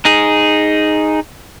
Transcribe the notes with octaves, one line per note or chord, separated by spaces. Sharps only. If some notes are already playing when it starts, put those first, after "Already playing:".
D#4 G#4